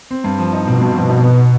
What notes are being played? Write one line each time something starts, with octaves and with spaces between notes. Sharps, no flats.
C4
G2
F3
D#4
B2 C4
G2
F3
D#4
B3